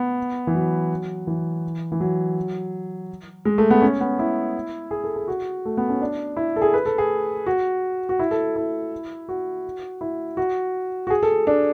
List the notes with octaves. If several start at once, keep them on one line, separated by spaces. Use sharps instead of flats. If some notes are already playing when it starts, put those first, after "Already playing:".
Already playing: B3
E3
F#3
E3
E3
F#3
G#3
A3
B3
C#4
B3
E4
G#4
A4
G#4
F#4
A3
B3
C#4
D4
E4
A4
G#4
B4
A4
G#4
F#4
F#4
E4
A4
E4
F#4
E4
F#4
F#4
G#4
A4
D4